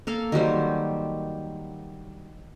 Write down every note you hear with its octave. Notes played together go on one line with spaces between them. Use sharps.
A#3 A4 F5
D#3 F#3 G3 C5